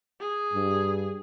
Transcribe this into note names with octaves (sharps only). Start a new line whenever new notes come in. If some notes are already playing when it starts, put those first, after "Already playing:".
G#4
G2